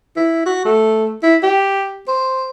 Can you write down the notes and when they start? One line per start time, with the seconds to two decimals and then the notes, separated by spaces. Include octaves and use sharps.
0.17 E4
0.46 F#4
0.65 A3
1.23 E4
1.43 G4
2.08 C5